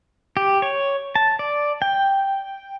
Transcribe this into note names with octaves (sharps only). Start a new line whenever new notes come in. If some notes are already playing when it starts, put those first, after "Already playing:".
G4
C#5
A5
D5
G5